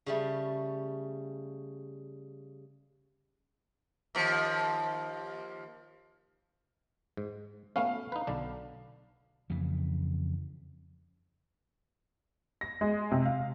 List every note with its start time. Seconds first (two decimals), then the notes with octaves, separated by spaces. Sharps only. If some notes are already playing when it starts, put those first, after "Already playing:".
0.06 C#3 G3 A3
4.15 D#2 F3
7.17 G#2
7.76 A3 B3 C#4 F5
8.12 D#4 B4
8.27 B1 D3 D4
9.50 F2 C#3 E3
12.61 A#6
12.81 G#3
13.12 C3
13.25 F5